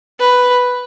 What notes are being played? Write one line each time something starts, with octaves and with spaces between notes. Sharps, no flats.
B4